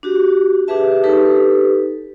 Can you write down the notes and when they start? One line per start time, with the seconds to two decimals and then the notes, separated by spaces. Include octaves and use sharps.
0.03 D4 F#4 G4
0.68 D4 G4 G#4 B4 E5 A5
1.03 D#4 G4 A4 B4